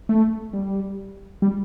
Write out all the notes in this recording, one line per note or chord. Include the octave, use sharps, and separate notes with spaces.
A3
G3
G3